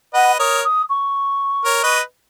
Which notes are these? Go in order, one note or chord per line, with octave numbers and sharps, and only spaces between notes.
B4 D#5 F#5
A#4 C#5 D#6
D#6
C#6
A#4 C#5
B4 D#5